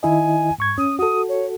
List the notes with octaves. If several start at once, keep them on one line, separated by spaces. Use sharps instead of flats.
D#3 E4 D#5 G#5
G#2 C#6 G#6
C#4 D#6
F#4 A4 D#6
C#5